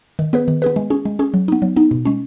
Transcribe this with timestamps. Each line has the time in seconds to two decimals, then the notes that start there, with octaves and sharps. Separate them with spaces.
0.19 D#3
0.33 B3 G#4 B4
0.48 D#3
0.62 B3 G#4 B4
0.76 G#3
0.90 C#4 G#4
1.05 G#3
1.19 C#4 G#4
1.34 F#3
1.48 B3 D#4
1.62 F#3
1.76 B3 D#4
1.91 B2
2.05 G#3 C#4